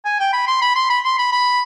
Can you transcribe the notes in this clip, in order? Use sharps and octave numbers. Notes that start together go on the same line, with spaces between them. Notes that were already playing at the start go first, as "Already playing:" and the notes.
G#5
G5
B5
C6
B5
C6
B5
C6
B5
B5